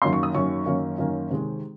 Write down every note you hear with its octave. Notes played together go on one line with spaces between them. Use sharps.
F#2 D#3 A#3 C#4 C6
C#6
D#6
F#2 D#3 A#3 C#4 C#6
F#2 D#3 A#3 C#4
F#2 D#3 A#3 C#4
C3 D#3 G#3